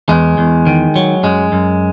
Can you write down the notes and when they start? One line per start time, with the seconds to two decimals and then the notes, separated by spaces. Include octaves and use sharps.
0.09 E2 G#3
0.38 E2
0.67 D#3
0.96 F#3
1.23 F#2 G#3
1.52 F#2